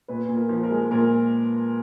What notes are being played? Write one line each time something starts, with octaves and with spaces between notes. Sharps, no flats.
A#2 B4
A#2
A#4
F3
A#4
G#3
A#2 A#4